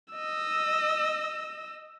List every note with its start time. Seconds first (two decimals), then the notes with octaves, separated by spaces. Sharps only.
0.13 D#5 E6